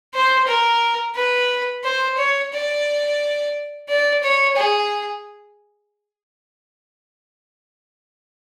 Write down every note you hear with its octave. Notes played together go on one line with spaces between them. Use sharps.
C5
A#4
B4
C5
C#5
D5
D5
C#5
G#4